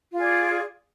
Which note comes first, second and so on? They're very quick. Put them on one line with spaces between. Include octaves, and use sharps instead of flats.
F4 G#4 D5